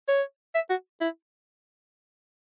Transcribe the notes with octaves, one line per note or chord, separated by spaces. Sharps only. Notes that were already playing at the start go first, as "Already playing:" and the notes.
C#5
E5
F#4
E4